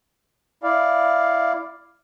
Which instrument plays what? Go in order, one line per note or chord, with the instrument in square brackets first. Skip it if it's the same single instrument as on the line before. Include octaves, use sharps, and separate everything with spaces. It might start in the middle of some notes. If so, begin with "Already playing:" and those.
[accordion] E4 D5 F5